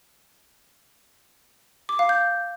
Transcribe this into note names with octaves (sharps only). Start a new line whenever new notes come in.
D6
F5
G6